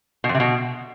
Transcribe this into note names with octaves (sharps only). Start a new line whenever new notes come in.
B2
F2
C3
B2